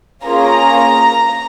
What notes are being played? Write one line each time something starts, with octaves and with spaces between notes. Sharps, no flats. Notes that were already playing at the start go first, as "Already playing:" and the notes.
A#3 C#4 F4 G#4 A#5